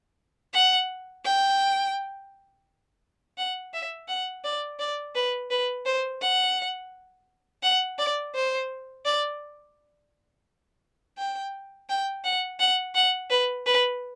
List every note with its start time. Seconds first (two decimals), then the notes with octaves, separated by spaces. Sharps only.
0.54 F#5
1.25 G5
3.38 F#5
3.74 E5
4.08 F#5
4.44 D5
4.79 D5
5.15 B4
5.51 B4
5.86 C5
6.22 F#5
7.63 F#5
7.98 D5
8.35 C5
9.05 D5
11.18 G5
11.90 G5
12.25 F#5
12.60 F#5
12.95 F#5
13.30 B4
13.66 B4